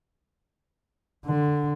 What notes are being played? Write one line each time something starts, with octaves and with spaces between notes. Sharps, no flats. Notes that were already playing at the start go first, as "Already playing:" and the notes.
D3